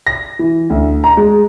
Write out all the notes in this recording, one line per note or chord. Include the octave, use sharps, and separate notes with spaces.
A#6
E3
D2
A#5
G#3